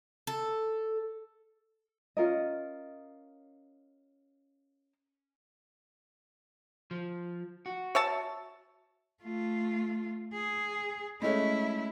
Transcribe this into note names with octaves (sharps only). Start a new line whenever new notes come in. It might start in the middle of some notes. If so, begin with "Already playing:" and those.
A4
C#4 F4 A#4 D#5
F3
F#4
C#5 E5 A5
A3 F4
G#4
G#3 A3 C#4 E4